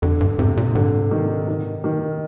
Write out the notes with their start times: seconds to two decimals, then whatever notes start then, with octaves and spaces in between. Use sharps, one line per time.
0.02 F2 D3
0.21 G2
0.38 G#2 C3
0.57 A#2
0.75 G#2 D3
1.11 D#3
1.48 D#3
1.84 D#3